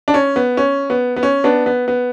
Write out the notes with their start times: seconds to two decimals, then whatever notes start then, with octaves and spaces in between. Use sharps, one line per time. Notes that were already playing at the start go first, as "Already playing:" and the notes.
0.08 D4
0.14 C#4
0.36 B3
0.57 C#4
0.90 B3
1.16 B3
1.23 C#4
1.44 B3 D4
1.66 B3
1.88 B3